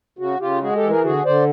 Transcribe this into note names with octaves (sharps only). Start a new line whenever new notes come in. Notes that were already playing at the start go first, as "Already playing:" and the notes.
C#3 F#4
C#3 F4 G4
G#3 F#4 G#4
G4 A4
E3
G#4 A#4
D3 F#4 G#4
D3 C5 D5